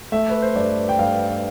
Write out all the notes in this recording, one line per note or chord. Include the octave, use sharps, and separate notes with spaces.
A3 E5
B4
C5
G2 D5
G5
G2 F5